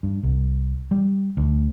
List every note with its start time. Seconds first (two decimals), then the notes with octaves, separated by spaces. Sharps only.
0.03 G2
0.23 C2
0.91 G3
1.37 D2